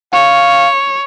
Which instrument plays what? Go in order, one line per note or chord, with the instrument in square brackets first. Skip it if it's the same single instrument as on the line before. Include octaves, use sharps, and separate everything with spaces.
[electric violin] C#5 [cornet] F5